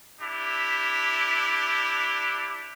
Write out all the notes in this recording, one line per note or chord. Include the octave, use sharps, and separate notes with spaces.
D4 E4 G4